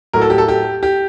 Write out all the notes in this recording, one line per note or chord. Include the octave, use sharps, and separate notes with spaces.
A2 F#3 A3 A#4
A4
G4
A4
G4
G4